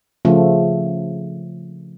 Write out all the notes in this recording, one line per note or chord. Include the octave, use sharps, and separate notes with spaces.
C#3 F3 A3